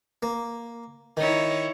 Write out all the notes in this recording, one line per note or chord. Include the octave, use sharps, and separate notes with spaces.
A#3
D#3 D#4 E4 C#5